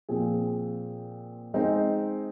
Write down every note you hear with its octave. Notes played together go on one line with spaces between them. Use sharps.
A#2 F3 C4 G#4
G#3 C4 D#4 C5